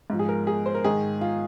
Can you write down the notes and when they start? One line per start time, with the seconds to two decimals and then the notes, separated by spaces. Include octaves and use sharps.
0.10 G#2 F3
0.19 G#4
0.29 A#4
0.47 G#4
0.66 C5
0.75 A#4
0.84 G#2 D#3 G#4
1.21 F4